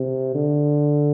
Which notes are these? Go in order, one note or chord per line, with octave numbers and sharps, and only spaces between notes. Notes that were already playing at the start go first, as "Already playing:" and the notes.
Already playing: C3
D3